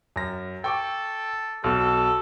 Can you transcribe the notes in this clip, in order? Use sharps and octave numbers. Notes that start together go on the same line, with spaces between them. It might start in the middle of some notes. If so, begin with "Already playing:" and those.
F#2 A#6
A4 G5 C#6 D6
B1 B2 A4